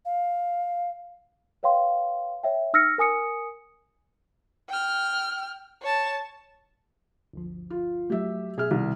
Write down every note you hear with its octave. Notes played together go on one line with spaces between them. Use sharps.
F5
B4 C#5 F5 G5 C6
C#5 E5 G5
D#4 E6 F6 A#6 C#7
A#4 G#5 D#6 C#7
G5 F6
C#5 A5
G1 D2 F3
F4
F#3 A3 G4 E5
B2 G#4 E5 F6
C2 D#3